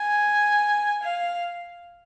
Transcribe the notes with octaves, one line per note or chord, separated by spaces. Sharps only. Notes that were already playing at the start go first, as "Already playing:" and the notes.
Already playing: G#5
F5